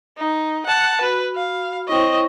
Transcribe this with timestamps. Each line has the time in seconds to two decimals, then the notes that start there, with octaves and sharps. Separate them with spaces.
0.17 D#4
0.66 F#5 A5
1.01 F#4 B4 B5
1.35 F5
1.88 C4 E4 C#5 D#5 C#6